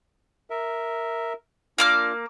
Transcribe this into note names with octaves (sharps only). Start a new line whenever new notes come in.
A#4 E5
A#3 D4 F4 D6 F6